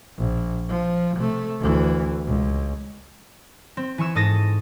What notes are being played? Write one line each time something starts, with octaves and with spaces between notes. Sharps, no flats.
A#1
F3
C3 A3
D2 E3
C#2
C4
E3 G#5 C#6 E6
G#2 A4 D#6 A6 A#6